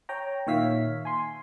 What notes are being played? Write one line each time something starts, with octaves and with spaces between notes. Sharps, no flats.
C#5 G5 A#5
A#2 D#3 C#5 E5 F5 B6
G#5 C6